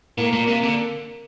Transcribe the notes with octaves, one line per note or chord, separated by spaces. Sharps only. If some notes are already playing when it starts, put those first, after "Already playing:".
A2 A#3
A#2
C3 A#3
D3